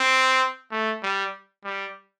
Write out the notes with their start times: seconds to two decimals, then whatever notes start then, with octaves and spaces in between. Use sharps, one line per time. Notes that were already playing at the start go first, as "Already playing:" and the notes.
Already playing: C4
0.71 A3
1.03 G3
1.64 G3